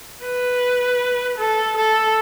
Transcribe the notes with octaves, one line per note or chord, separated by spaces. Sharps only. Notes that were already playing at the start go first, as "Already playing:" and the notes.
B4
A4
A4